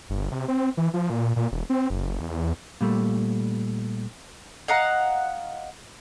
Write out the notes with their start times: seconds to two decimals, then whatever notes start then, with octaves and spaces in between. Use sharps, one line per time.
0.10 G1
0.32 C3
0.48 C4
0.77 E3
0.94 F3
1.10 A#2
1.36 A#2
1.52 E1
1.70 C4
1.90 F#1
2.20 E2
2.81 A#2 G3 A3
4.68 D#5 F5 F#5 A#5